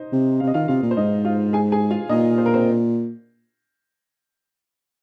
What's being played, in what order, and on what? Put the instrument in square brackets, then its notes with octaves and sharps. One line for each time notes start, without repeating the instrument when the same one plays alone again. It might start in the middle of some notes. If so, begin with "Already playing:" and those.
Already playing: [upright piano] D#4 C5 D#5
[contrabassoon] C3
[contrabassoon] C3 [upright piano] F5
[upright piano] D#5
[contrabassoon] D#3 [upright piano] F4 F5
[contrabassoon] C3 [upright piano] F4 F5
[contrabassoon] A#2
[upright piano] C5
[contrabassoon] G#2 [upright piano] D#4 D#5
[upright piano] F4 F5
G#4 G#5
G#4 G#5
F4 F5
[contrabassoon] A#2 [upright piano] D#4 D#5
[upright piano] C5
A#4
C4 C5